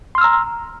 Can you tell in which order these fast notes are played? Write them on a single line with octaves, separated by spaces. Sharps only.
C6 F6 E6 A#5